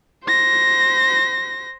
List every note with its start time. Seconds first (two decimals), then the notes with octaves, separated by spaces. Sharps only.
0.25 C5 A#6